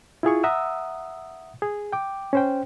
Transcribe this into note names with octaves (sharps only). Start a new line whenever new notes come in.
E4 F4 G#4 C#6
E5 F#5 A#5 D#6 E6
G#4
G5 D6
C#4 C5 G5